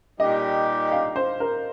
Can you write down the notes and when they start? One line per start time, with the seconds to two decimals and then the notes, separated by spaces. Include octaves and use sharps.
0.19 A#2 G3 D#4 G4 D#5
0.92 F5
1.16 C5
1.40 A#4